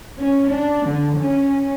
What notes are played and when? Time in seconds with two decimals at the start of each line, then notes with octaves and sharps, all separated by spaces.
0.18 C#4
0.49 D4
0.87 D3
1.17 C#4